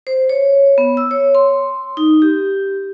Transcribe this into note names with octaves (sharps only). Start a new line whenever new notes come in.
C5
C#5
B3
E6
C#5
C6
D#4
G4